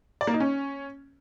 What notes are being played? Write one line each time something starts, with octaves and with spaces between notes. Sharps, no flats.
D5
A#3
D#4
C#4